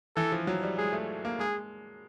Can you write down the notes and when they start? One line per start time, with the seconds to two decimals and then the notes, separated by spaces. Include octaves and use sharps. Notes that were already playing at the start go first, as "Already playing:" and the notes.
0.16 E3 A4
0.32 F3
0.47 F#3
0.63 G3
0.78 G#3 G#4
0.93 A3
1.25 A#3
1.39 G#3 G#4